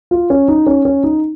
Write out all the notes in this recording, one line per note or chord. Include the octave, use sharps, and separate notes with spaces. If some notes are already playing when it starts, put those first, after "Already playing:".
F4
C#4
D#4
C#4
C#4
D#4